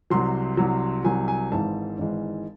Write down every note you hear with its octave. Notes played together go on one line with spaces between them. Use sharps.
C2 C3 F#3 C6
C2 C3 F#3
C2 C3 F#3 G#5
G#5
G#1 G#2 E3 G#3 A5
G#1 G#2 E3 G#3